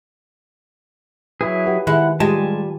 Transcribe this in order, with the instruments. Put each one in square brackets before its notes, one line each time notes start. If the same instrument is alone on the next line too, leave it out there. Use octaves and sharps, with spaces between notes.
[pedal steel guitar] F#3 E4 G#4 [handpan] B4
[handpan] G4 B4 F#5
[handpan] D#3 [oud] G#3 E4 [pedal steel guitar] F#5
[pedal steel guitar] G3 G#5 A5 [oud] G#3 [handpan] F4 G4